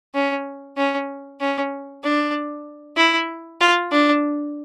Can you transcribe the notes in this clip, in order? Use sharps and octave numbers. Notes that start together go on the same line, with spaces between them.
C#4
C#4
C#4
D4
E4
F4
D4